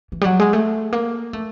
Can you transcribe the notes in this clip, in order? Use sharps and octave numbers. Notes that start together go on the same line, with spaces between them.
E3
G3
F#3
G#3
A3
A#3
A3